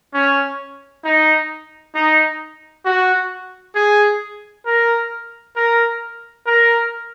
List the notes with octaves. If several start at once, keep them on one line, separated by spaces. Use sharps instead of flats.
C#4
D#4
D#4
F#4
G#4
A#4
A#4
A#4